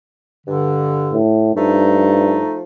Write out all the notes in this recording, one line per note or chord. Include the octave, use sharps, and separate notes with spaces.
G2 D3
A2
G2 F3 A3 D#4